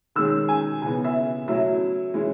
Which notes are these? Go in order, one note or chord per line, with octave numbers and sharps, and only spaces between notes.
D#3 G#3 C#4 E6
G#5
C#3 E3 B3 G#5
E5
F#3 A3 C#4 E4 E5
E3 G#3 C#4 E4